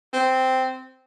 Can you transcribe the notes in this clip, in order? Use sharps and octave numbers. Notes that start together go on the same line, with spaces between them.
C4